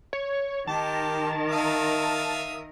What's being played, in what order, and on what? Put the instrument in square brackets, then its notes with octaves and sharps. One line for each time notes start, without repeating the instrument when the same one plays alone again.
[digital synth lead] C#5
[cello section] D#3 A#4 [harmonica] G4 [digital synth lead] A5
[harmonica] E5 F5 D#6